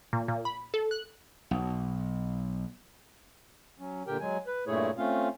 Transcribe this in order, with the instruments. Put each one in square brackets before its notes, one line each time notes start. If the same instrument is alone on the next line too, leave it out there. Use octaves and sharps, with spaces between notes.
[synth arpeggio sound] A#2
A#2
B5
A4
F#6
[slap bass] B1
[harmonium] F#3 C#4
A#2 D3 G4 A#4 G5
F#3 G#3 G#5
B4
G2 A#2 A3 E4 G#4 C#5
A3 C4 C#4 F4 F5